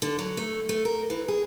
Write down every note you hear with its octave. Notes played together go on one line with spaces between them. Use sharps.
D3
F#3
A3
A3
A#4
E3
G#4